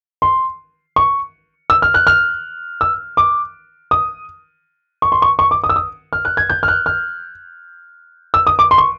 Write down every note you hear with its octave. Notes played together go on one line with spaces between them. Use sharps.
C6
C#6
E6
F6
F#6
F6
E6
D6
D#6
C#6
C6
C#6
C#6
D6
D#6
E6
D#6
F6
F#6
G#6
G6
F6
F#6
F6
E6
D#6
D6
C6
C#6